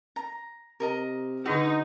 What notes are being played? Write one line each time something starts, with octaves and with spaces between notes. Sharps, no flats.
A#5
C3 A#4 D#5 A#5
D3 D4 D#4 F#4 G#4